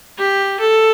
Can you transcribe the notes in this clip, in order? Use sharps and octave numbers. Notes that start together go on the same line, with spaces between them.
G4
A4